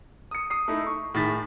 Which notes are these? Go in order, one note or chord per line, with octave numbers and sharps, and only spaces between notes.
D#6 C#7
D#6 C7
A3 D#4 E4
C#6
A2 D#3 G#4 A6 B6